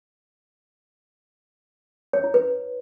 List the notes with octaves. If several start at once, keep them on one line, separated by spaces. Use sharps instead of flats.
C#5
E4
B4